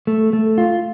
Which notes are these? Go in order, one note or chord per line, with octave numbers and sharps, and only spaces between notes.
A3
A3
F4